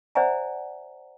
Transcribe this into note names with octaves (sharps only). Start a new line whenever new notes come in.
C5 D5 E5 F#5 G#5 A#5